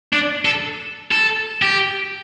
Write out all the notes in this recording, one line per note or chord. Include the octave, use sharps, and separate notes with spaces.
D4
A4
A4
G4